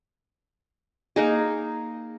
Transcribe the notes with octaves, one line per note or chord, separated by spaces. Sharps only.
A#3 D#4 G#4